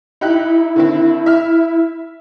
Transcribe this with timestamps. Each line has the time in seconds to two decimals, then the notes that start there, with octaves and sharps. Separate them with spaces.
0.21 D#4 E4 G4 F#6
0.76 D3 D#3 C4
1.26 E5 F6